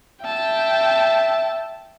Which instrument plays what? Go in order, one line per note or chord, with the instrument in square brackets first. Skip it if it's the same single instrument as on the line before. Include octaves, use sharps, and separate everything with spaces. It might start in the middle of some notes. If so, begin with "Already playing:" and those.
[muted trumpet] E5 [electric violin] G5 A5